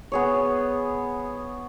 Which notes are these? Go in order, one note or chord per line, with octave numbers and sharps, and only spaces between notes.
B3 G#4 C#5